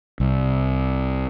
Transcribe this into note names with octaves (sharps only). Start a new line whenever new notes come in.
C2